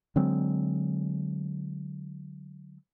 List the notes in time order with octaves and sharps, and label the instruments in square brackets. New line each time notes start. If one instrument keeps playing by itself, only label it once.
[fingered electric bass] D3 F#3 G#3 C4